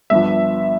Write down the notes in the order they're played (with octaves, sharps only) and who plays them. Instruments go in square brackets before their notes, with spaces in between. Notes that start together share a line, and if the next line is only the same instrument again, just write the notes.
[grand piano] G1 G2 F3 E5